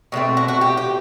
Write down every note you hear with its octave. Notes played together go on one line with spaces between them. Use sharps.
B2 F#3 A3 C4
F#4
F#4
G4
G4